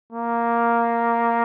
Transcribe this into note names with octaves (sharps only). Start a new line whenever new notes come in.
A#3